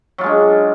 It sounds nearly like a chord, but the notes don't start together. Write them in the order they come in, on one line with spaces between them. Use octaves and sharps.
F#3 F4 G#3 D4